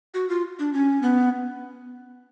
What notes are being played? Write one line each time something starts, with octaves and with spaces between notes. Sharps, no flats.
F#4
F4
D4
C#4
B3